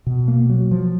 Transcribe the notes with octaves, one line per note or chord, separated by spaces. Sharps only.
B2
A#3
F#3
F3